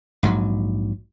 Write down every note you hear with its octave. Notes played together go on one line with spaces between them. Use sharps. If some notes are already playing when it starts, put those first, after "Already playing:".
A#1 G#2 F#3